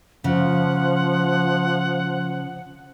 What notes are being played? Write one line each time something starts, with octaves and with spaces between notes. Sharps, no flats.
C#3 F3 F#5